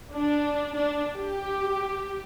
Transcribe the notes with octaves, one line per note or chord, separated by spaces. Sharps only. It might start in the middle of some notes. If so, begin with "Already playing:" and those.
D4
D4
G4